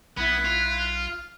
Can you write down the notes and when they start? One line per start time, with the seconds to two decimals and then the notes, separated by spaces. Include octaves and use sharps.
0.18 B1 B3 E4 F#6 G#6
0.45 F4
0.95 F6